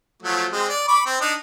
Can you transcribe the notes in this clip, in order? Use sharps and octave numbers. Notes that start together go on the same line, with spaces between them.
F3 F#3 A3
G#3 C4
D5
B5 C#6 D6
C4
D4 D#4